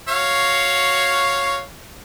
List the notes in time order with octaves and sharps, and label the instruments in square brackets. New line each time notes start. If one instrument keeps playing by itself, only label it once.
[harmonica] F#4 C#5 F5